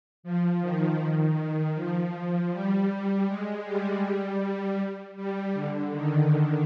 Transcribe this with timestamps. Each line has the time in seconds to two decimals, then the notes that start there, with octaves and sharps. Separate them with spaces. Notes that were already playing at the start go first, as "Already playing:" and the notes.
0.23 F3
0.61 D#3
1.37 D#3
1.75 F3
2.51 G3
3.27 G#3
3.64 G3
5.16 G3
5.54 D3
5.92 D#3